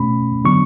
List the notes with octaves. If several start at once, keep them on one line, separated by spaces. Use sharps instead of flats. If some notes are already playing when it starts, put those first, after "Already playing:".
Already playing: B2 A3 C#4 B5
D3 F#3 B3 D4 C#6